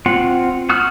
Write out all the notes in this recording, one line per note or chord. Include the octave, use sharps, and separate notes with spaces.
C4 F4 F#5
F#4 D#6 F6 F#6